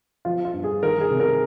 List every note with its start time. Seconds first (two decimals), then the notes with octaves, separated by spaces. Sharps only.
0.25 F3 F4
0.45 F4
0.54 G2
0.64 G#4
0.83 D#3 A#4
1.01 G#4
1.11 C3
1.20 A#4